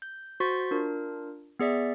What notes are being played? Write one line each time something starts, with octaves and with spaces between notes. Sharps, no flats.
G6
F#4 C5 C6 C#6 A6 B6
D4 F4 A#4
B3 G#4 D5 E5